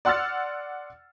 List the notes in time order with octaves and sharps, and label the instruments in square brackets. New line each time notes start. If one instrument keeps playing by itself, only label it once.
[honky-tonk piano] D5 F#5 C6 E6 F6 A6